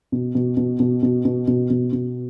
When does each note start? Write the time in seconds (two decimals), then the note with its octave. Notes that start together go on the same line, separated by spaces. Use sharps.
0.12 B2
0.35 B2
0.57 B2
0.80 B2
1.03 B2
1.25 B2
1.48 B2
1.70 B2
1.93 B2